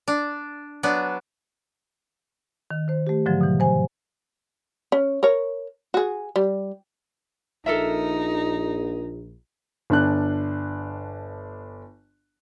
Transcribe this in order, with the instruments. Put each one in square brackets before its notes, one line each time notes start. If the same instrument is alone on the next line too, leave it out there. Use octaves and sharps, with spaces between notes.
[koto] D4
F#3 B3 D4
[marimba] D#3
D#3 C5
A3 G4
G#2 D3 F3 F#3
B2 E3
G2 C5 G#5
[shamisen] C#4
A#4 C#5
F#4 G#4
G3
[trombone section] A#1 [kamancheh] D#4 [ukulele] A4 A#4 E5
[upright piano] G1 D4 F#6